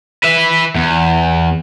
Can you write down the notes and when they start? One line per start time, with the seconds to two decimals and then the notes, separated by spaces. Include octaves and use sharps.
0.24 B4 E5
0.75 E2